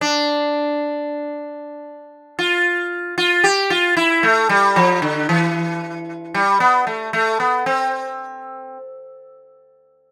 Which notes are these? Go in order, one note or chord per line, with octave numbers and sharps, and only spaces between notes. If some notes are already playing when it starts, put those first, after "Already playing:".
D4
F4
F4
G4
F4
E4
A3
G3
F3
D3
E3
G3
B3
A3
A3
B3
C4